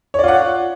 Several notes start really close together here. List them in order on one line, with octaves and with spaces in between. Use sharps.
C#5 D5 F4 F#5